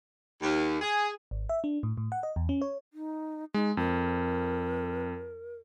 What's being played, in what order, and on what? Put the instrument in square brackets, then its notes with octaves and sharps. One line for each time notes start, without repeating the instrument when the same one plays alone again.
[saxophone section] D#2
G#4
[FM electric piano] G#1
E5
D4
A2
A2
F#5
D#5
E2
C#4
C#5
[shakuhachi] D#4
[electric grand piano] G#3 [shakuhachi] D#4
[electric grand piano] F2 [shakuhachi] A#4